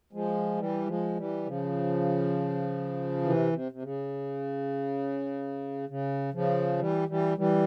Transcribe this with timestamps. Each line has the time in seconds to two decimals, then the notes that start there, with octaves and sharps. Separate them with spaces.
0.13 F3 G#3
0.57 E3 G3
0.86 F3 G#3
1.17 E3 G3
1.46 C#3 F3
3.23 C3 E3
3.53 C3
3.72 C3
3.82 C#3
5.89 C#3
6.34 C#3 F3
6.79 E3 G3
7.08 E3 G3
7.38 E3 G3